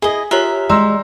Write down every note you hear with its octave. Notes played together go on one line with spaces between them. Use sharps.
E4 G#4 D#5
F4 G4 A#4 C#5 E5
G#3 D5 A#5 C6 E6